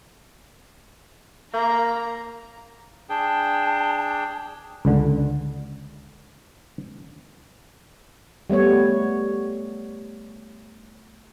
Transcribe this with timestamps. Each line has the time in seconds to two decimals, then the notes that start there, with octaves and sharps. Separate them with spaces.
1.54 A#3 A#5
3.09 D4 G#4 G5 A5
4.85 C#2 D3
8.50 G3 A3 B3 C#5